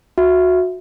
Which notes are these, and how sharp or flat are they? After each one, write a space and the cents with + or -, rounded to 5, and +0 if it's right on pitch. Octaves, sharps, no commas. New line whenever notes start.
F#4 -20 E5 +5